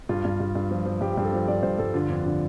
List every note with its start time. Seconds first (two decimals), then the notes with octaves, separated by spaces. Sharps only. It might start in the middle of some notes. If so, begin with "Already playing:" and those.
0.09 G2 F4
0.25 G2
0.40 G2
0.55 G2
0.71 F3
0.86 F3
1.01 G2 G4
1.13 G4
1.18 G2
1.25 A4
1.33 F3 C5
1.48 G2 D5
1.63 G2 C5
1.78 G2 A4
1.94 D3 F4
2.10 F2 D4
2.25 D3 F4